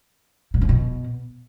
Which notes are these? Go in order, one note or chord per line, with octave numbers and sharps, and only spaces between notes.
B2
D3
B2